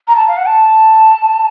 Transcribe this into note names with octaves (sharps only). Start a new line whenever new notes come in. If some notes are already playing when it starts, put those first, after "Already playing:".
A#5
A5
F5
F#5
A5